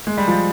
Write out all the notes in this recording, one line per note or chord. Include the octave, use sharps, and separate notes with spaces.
G#3
G3
F3